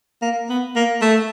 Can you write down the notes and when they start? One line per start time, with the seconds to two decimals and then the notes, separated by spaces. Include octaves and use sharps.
0.22 A#3
0.50 B3
0.76 A#3
1.02 A3